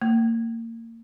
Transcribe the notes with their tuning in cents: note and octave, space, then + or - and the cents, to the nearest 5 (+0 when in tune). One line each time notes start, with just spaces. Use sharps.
A#3 -30